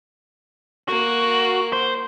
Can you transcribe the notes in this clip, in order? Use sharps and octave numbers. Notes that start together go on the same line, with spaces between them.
A#3 F#4
C5